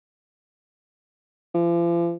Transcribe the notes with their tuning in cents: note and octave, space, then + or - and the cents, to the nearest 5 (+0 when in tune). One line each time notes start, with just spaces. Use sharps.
F3 -40